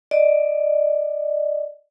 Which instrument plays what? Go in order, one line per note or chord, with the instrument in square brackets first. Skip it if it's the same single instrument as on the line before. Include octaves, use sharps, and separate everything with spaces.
[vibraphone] D5 D#5